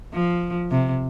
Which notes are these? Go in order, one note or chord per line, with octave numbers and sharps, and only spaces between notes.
F3
C3